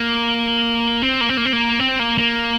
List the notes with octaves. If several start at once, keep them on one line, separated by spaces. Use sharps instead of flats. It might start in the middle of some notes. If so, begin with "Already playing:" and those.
Already playing: A#3
C4
A#3
C4
A#3
C4
A#3
C4
A#3
A#3